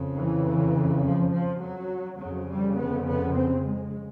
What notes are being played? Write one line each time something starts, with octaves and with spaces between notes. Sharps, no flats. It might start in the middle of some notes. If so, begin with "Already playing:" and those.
Already playing: F2 C#3
E3
F3
F3
F#3
F2 C#3 F#3
G3
B3
B3
C4
G#3